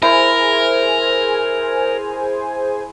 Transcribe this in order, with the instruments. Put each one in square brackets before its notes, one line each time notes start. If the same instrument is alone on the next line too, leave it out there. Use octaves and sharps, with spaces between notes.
[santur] E4 [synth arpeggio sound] G#4 C5 G#5 [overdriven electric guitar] A#4